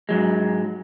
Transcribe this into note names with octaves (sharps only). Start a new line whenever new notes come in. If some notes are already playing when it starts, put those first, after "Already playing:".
G#2 F#3 G#3